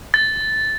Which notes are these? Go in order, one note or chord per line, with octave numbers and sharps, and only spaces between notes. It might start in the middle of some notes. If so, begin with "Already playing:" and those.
A6